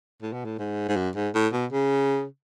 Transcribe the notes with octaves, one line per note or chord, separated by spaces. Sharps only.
A2
B2
A2
G#2
G#2
F#2
G#2
A2
B2
C#3